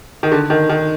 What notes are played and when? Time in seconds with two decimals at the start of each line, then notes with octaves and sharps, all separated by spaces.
0.23 D#3
0.32 D3
0.50 D#3
0.69 D#3